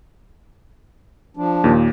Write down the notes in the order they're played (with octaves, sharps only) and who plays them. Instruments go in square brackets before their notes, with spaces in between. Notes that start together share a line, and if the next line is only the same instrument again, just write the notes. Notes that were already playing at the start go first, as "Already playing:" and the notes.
[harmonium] F3 D4
[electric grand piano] D#2 A#2